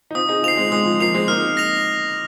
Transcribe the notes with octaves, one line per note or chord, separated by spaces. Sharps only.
D#4
C4 F4 D#6
D#4 G#4
C4 F4 C7 F7
G#3 C4
G#3 D#6
F3
F3 A#3 C7 F7
G#3 C4
A#3 D#4 F6
A#6 F7